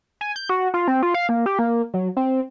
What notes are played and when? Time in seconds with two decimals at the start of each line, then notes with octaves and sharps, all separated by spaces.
0.21 G#5
0.36 G6
0.49 F#4
0.74 F4
0.88 C4
1.03 F4
1.14 F5
1.29 A#3
1.46 G4
1.59 A#3
1.94 F#3
2.17 C4